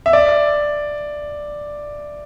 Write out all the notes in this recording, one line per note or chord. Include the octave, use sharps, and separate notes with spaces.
E5
D5